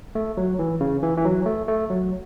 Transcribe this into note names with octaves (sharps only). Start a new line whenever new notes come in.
A3
F#3
E3
C#3
E3
E3
F#3
A3
A3
F#3